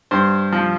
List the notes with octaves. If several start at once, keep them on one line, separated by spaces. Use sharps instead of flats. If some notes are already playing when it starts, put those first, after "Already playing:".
G2 C5
F3